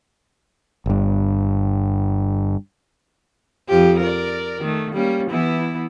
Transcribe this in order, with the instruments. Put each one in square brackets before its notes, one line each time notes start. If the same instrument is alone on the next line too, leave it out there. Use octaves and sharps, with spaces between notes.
[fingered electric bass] G1 G2
[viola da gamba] F2 F3 G4
A#4 D5
D#3 A3
G3 A#3 C#4
E3 B3 E4